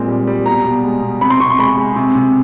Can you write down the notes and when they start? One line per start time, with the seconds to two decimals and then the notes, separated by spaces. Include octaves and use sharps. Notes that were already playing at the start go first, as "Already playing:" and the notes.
Already playing: A#2 G#3 C4
0.08 G3
0.27 G3
0.46 B2 A#5
0.65 B2
0.84 G#3
1.03 B2
1.21 C3 B5
1.30 C6
1.40 C3 C#6
1.50 C6
1.58 G#3 B5
1.78 G#3
1.96 C3
2.15 C3